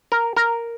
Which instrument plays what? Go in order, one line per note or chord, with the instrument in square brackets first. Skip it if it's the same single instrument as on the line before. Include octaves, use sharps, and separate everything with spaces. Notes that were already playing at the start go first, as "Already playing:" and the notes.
[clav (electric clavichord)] A#4
A#4